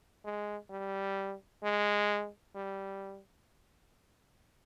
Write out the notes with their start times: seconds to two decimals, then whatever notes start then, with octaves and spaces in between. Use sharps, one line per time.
0.25 G#3
0.70 G3
1.63 G#3
2.55 G3